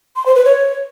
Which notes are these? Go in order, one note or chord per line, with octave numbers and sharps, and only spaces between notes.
C6
C5
B4
C#5